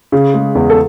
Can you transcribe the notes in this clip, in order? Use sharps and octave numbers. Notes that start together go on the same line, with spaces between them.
C#3
G#3
E2
A4